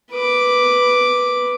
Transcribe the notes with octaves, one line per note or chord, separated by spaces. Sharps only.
B4 D6